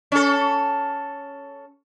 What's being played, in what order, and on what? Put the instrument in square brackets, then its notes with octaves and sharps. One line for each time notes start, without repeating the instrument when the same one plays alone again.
[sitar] C#4 A4